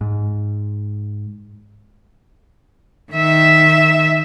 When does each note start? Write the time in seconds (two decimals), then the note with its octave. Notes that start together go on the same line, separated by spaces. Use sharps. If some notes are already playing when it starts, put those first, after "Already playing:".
0.01 G#2
3.12 D#3 E5